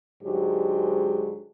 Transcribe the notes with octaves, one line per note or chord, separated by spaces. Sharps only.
G#2 D3 F#3 G#3 G4 G#4